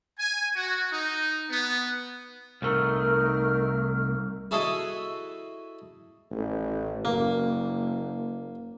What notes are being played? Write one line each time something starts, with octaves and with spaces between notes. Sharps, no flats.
G#5
F#4
D#4
B3
C2 A3 D#4 A#4 F6
E4 F#4 G#4 A4 D#5 E5
A1
F#1 A#3